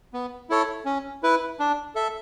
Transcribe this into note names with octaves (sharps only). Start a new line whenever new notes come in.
B3
E4 A4 C#5
C#4
E4 B4
D4
A4 E5